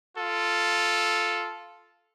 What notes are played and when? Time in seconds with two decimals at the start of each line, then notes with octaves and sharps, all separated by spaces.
0.16 F4 A4